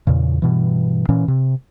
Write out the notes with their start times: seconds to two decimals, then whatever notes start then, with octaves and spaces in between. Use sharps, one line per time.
0.07 E2 A#2 C#3
0.42 G2 B2 E3
1.09 A#2 E3 C#4
1.28 C3